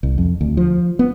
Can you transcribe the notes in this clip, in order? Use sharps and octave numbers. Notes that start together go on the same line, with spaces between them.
C2
F2
D2
F3
B3